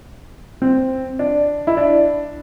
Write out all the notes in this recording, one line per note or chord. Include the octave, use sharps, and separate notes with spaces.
C4
D4
E4
D4